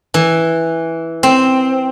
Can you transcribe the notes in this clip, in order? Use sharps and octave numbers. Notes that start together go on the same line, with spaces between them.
E3
C4